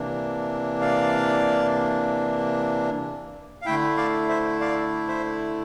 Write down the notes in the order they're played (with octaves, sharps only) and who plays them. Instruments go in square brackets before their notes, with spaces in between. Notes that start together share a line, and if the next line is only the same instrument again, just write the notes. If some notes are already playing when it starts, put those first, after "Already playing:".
Already playing: [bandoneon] C3 E3 A#3 D4
D5 F5
F5
D3 A3 E4 E5 G5
D5 F5
C5 E5
D5 F5
C5 E5